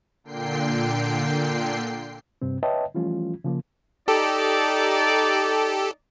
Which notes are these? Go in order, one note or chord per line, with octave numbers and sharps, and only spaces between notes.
A#2 D3 G5 C7
G2 C3 C4
B4 C#5 D#5 E5 G5 A5
E3 F3 G3 A3 C#4 F4
C#3 F3 A#3
D#4 G4 A4 D5